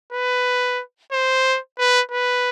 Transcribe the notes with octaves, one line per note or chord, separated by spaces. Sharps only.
B4
C5
B4
B4